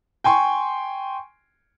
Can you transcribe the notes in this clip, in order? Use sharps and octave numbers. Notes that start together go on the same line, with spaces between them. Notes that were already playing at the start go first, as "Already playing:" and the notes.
G5 G#5 C6 C#6